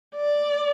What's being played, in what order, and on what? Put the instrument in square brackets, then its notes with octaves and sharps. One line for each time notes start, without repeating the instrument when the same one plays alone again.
[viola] D5